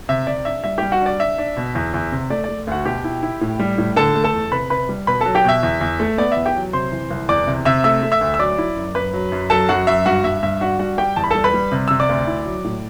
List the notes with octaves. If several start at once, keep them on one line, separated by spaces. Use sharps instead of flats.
C3 E5
C3 D5
D4 E5
G3 E5
G3 G4 G5
F#4 F#5
D4
D5
D4 E5
D4
B2
E2
E2
C3
A3 D5
A3 D5
D2 F#4 F#5
B2 G4 G5
E4
E4
A2
G3
A2
D3 A4 A5
A3
A4 A5
E2
C3 B4 B5
C3 B4 B5
G3
B2 B4 B5
F#3 A4 A5
G4 G5
B2 E5
E2
E2
A3
B3 D5
E2 E5
G4 G5
F#3
C3 C5 C6
E3
C2
E2 D5 D6
C3
C3 E5 E6
A3 E5 E6
A3
E5 E6
D2
E6
F#3 D5 D6
E4
F#2
F#2 B4 B5
F#3
F#2
F#3 A4 A5
F#2 F#4 F#5
F#2 E5
G2 F#4 F#5
G2 E5
G2 E5
D4 F#4 F#5
G3 F#4 F#5
G3 G4 G5
E2 A5
B5
G3 A4 A5
B4 B5
G3
C3
C3 E6
D5 D6
D2
E4
F#3
A2